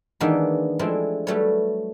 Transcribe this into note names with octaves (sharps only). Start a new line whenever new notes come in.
D#3 E3 G#3 A#3 B3 D4
F3 G#3 A3 C4 D4 E4
F#3 G3 A3 A4 B4 C#5